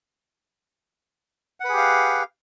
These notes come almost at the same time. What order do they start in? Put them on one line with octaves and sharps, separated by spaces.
F#5 B4 G#4 G4 F5